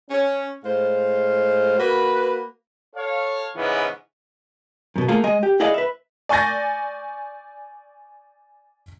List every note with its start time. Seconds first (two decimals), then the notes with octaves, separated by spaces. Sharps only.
0.10 C#4
0.63 A2 G#3 C5 F5
1.78 A#3 F#4 B4
2.95 A4 C#5 F5
3.56 G#2 C#3 E3 G#3 B3 C#4
4.96 F#2 B2
5.08 A3 A#3 F4 G#4 F5
5.24 G#3 D#5 G#5
5.43 G4
5.60 E4 G#4 D5 D#5 F5 F#5
5.74 B4 E5
6.29 D5 G#5 C#6 G6 A6 A#6